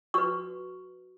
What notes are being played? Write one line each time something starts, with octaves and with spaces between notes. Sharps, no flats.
F#4 B4 C#6